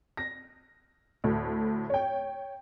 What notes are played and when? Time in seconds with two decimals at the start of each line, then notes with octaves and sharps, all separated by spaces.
0.17 A#6
1.24 D2 A2
1.90 C#5 G5